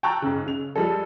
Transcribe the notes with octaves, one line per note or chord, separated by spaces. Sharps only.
G5 A5 A#5 C#6 E6 F#6
G#2 C#3
C#3 F7
F3 G3 G#3 A4